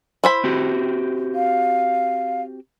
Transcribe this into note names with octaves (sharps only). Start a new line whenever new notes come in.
E4 C5 B5
C4 F#4 G4
F5